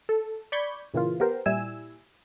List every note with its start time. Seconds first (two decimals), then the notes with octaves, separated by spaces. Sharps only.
0.09 A4
0.52 D5 B5 C#6 G6 G#6 B6
0.94 A#2 C#3 E3 A#3 F4
1.20 B3 G4 A#4 C5
1.46 A#2 G3 E4 G#5 E6